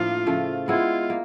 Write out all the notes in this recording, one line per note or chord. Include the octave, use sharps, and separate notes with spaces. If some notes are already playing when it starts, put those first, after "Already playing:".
Already playing: A2 F3 A#3 D4 F4
C#3 F3 A3
G#3 B3 E4 F4
A#3